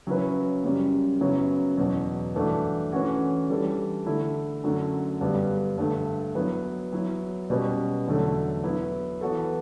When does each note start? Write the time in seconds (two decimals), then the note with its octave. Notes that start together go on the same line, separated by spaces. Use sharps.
0.07 C#3 F#3 C#4 E4 B4
0.64 F#2 C#3 G3
1.20 F#2 C#3 F#3 B3 E4
1.77 E2 B2 F#3
2.35 G2 E3 A3 D4 F#4
2.92 E3 A3 C#4 F#4
3.50 E3 G3 D4 A4
4.06 D3 A3 E4
4.64 F#2 D3 F#3 A3
5.21 G2 D3 G3 B3
5.78 G2 D3 A3
6.35 F#3 B3 E4 B4
6.93 F#3 B3 E4
7.50 B2 G3 C#4 F#4 B4
8.07 E2 D3 F#3 A3
8.64 F#3 B3 E4
9.21 E3 B3 F#4 A4